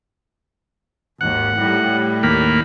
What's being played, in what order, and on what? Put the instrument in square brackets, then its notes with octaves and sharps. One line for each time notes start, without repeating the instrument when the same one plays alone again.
[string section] G#1 D#2 [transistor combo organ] F#5
[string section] A2 G3
[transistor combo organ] D#2 A#3 B5